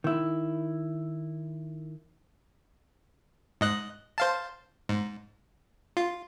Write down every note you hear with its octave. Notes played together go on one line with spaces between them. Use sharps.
D#3 E4
G#2 D#5 F#6
C5 F5 A5
G#2
F4